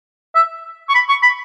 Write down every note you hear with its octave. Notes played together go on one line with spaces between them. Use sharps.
E5
C#6
B5
C#6
B5